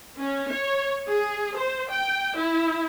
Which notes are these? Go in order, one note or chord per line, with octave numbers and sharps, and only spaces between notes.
C#4
C#5
G#4
C5
G5
E4